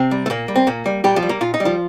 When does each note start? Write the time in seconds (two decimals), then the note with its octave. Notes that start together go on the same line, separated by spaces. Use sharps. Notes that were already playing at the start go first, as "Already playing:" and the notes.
Already playing: C3 C4
0.11 G3
0.26 A3
0.30 A#2 A#3
0.48 G3
0.56 C4
0.67 A#2 A#3
0.86 G3
1.04 A#2 G3 G4
1.16 F3 F4
1.22 G3
1.29 A#3
1.41 A#2 F4
1.54 D#4
1.60 G3
1.65 F3 F4